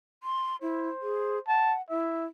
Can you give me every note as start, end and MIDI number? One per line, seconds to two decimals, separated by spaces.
0.23 0.56 84
0.62 0.90 64
0.62 1.41 72
1.02 1.39 68
1.47 1.82 78
1.47 1.75 81
1.90 2.26 64
1.90 2.25 76